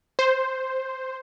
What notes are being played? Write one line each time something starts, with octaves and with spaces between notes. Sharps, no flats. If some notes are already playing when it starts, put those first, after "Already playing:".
C5